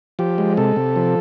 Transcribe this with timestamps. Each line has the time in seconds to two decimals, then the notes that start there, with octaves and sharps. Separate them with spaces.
0.19 F3 G4
0.38 G#3
0.57 C3 A4
0.76 C3
0.96 F3